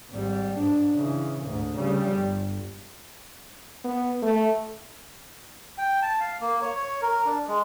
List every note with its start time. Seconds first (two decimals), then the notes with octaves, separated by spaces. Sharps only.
0.10 G#1 G3
0.58 G#2 D4
0.95 C#3 E3
1.46 D2 G#2
1.76 C#3 G3
2.11 G1
3.84 B3
4.22 A3
5.78 G5
6.02 A5
6.20 F5
6.41 A#3
6.62 C#5
6.76 C#5
7.02 A#4
7.25 D4
7.48 G#3